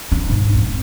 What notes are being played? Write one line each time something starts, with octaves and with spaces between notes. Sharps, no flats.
D4
G#2
C4